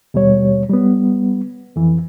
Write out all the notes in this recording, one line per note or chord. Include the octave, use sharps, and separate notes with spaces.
D#2 B2 G3 C#5
G3 B3
F2 E3